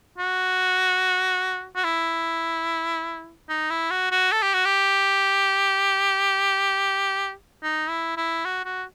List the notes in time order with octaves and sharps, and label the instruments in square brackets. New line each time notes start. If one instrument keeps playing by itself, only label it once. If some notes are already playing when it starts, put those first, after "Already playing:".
[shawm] F#4
F#4
E4
D#4
E4
F#4
F#4
A4
G4
F#4
G4
D#4
E4
E4
F#4
F#4